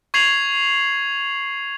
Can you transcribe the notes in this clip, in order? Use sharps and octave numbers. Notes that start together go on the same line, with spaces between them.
C#6 G#6 C7 F7 F#7